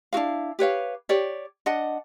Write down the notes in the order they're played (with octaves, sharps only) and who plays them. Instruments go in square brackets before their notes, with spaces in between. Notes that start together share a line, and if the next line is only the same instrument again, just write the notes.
[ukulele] D4 E4 F#4 F5
G4 B4 C#5 F5
G4 C#5 D5
D4 D#5 F#5